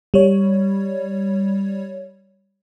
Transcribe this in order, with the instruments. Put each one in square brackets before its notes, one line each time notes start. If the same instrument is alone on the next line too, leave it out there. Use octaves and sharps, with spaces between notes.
[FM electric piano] G3 C#5